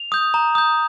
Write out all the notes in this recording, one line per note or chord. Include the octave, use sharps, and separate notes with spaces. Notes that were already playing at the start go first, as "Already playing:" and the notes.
Already playing: F7
D#6 G6
A#5
D#6 G6